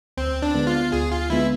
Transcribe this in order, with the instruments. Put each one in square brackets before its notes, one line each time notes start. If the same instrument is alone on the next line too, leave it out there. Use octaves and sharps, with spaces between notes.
[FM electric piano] D2 [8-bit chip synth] C4
[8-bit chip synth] D4
[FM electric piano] D3 G#3 B3
[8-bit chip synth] F4
[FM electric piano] D2 [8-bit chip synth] G#4
[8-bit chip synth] F4
[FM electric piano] D3 G#3 B3 [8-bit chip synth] E4